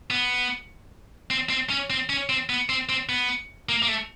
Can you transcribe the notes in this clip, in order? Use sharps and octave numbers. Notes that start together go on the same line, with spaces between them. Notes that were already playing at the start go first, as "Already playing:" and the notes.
B3
C4
C4
C#4
C4
C#4
C4
B3
C4
C4
B3
A#3
A#3
A3